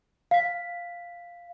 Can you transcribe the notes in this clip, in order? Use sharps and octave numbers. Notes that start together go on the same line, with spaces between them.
F5 B6